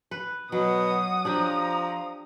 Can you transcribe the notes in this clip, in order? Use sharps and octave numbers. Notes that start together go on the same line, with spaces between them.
B4
B2 F#3 F#5 D#6
F3 D4 G4 A#5